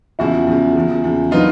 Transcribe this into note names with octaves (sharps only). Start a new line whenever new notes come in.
E2 C#3 F3 E4 F#4
E2 C#3 F3
E2 C#3 F3
E2 C#3 F3
D#3 F#3 B3 D4 D#4 F4